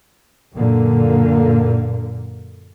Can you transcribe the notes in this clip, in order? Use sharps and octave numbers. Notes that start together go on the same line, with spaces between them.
F#2 A#2 D3 A#3